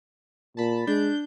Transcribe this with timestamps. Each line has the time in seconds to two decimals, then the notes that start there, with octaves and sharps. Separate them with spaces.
0.57 A#2 A5 B5
0.87 G#3 D4 G6